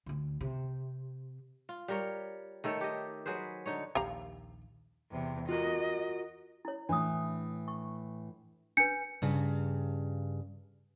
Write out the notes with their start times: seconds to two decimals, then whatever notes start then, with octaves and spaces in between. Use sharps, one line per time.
0.06 D2 D3
0.41 C3
1.69 F4
1.88 G3 A#4 C#5
2.64 D#3 A3 A4 C#5
2.81 G4 D#5
3.26 F#3 G#4 B4 C5
3.66 D3 D#4 C#5
3.95 A#1 D#2 G4 F5 A#5
5.11 E2 C3
5.49 F4 F#4 A#4 D#5
6.65 E4 C#5
6.89 A2 E3 D4 D#6
7.68 C#6
8.77 D4 B4 G6 C#7
9.22 G2 C#3